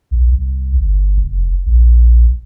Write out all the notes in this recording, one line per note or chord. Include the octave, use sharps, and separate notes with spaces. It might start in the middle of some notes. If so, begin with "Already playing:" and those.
B1
C2
G1
F1
A#1